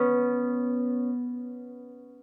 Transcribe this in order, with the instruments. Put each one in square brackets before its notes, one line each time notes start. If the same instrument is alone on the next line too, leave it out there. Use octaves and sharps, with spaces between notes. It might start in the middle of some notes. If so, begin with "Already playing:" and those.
Already playing: [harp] B3 C#4